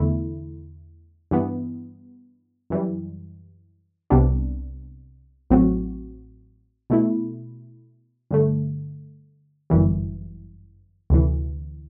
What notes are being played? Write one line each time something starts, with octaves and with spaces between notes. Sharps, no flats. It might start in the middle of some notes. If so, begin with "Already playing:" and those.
Already playing: E2 D3 A3 E4
G2 E3 B3
F#2 E3 G3
C2 C3 G3 B3 D4
A1 A2 F#3 C4 F#4
B2 A3 E4
G2 D3 A3
G1 F#2 E3 G3
D2 C3 E3